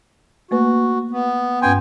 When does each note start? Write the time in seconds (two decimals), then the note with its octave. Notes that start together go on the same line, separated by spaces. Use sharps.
0.51 A3 A#3 F#4 B4
1.11 B3
1.62 G2 B3 C#4 G5 G#5 C6